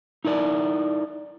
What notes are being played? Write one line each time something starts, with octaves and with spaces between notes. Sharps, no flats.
D#4 E4 A#4 D5